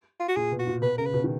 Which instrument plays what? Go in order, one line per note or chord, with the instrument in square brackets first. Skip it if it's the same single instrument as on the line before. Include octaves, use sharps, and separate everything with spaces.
[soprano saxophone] F4
F#4
[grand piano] A#2 [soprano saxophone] G#4
[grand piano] B2
[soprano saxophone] F#4
[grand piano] A#2
[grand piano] B2 [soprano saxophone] B4
[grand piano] C#3 [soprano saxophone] A#4
[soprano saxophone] B4
[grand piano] B2
D#3